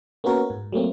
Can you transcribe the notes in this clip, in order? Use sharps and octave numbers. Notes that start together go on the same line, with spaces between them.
A#3 B3 C#4 F#4 A#4
G#2
F#3 A3 A#3 C4